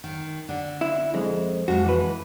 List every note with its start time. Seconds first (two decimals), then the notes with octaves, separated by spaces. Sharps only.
0.04 D#3
0.49 D3
0.81 E4
1.14 F2 G#3
1.68 F2 G#3 F#4
1.84 E3 B4